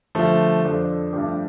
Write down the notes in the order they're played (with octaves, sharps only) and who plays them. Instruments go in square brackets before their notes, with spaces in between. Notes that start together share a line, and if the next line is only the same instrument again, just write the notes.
[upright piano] D3 G3 D4 F4 [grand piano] F3 A3
[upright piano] F2 F3 D4 A4 C5
G2 F3 A3 D4 G4